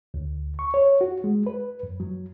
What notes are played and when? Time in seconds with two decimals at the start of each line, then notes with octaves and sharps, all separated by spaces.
0.14 D2
0.59 C#6
0.74 C#5
1.01 F#4
1.24 G#3
1.47 B4
1.83 F#2
2.00 F#3